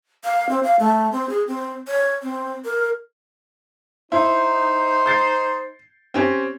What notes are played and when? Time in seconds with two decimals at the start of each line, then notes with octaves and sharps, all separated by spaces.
0.24 F5
0.49 C4
0.63 F5
0.80 A3
1.12 C4
1.29 G#4
1.47 C4
1.88 C#5
2.23 C4
2.65 A#4
4.12 D#4 E4 C5
5.06 G6 A6 C7
6.14 C4 C#4 G4